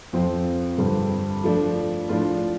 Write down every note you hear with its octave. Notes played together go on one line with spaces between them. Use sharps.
F2 F3 C4
G2 D3 G3 C4
F3 A3 D4
A2 F3 A3 D4 F4